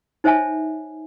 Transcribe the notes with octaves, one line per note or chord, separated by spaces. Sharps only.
D#4 C5 C#5 E5 G#5 A5